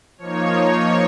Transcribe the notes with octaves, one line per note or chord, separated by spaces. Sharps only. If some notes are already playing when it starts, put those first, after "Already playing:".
F3 A#3 D#4 C#5